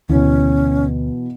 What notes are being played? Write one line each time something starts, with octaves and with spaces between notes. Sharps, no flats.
D2 B2 E3 C#4